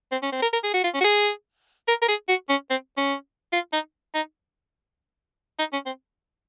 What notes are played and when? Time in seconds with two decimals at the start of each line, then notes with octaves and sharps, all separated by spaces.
0.12 C4
0.22 C#4
0.32 C4
0.42 A#4
0.53 A#4
0.64 G#4
0.74 F#4
0.84 F4
0.94 C#4
1.01 F#4
1.04 G#4
1.88 A#4
2.02 A#4
2.09 G#4
2.28 F#4
2.49 C#4
2.71 C4
2.97 C#4
3.53 F4
3.73 D#4
4.15 D#4
5.59 D#4
5.73 C#4
5.86 C4